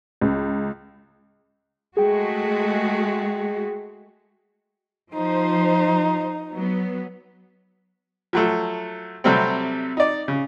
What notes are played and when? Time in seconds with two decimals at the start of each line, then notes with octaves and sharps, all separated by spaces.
0.21 C#2
1.97 G#3 A3 F#4 G#4 G5
5.14 F3 D#4 C5
6.53 F#3 B3
8.33 F3 F#3 A3
9.24 C3 F#3 G3 A3 C4
9.97 D#4 D5
10.28 C#3